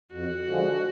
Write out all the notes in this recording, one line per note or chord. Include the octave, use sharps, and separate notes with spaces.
F2 F#4
D3 F3 G#3